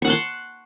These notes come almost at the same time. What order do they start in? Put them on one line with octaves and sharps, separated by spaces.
C#6 F#5 A5 C6